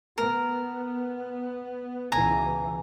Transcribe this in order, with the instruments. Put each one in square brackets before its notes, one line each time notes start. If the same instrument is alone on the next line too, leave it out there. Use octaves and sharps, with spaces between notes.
[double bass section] B3 [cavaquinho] A#4
[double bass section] C#2 B2 E3 [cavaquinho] G#5 A#5